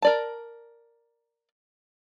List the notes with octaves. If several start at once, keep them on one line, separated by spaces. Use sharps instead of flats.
A#4 D5 A5